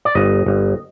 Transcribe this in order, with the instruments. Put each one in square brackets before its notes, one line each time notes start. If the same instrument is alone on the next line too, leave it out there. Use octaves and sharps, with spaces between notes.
[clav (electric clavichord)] D5
G1 D#5
G1